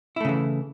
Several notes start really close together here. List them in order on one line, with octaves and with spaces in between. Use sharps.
E4 A3 C#3 E3